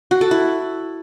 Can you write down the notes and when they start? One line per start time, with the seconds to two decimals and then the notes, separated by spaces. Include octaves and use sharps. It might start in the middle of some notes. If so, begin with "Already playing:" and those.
0.11 F#4
0.21 A4
0.31 E4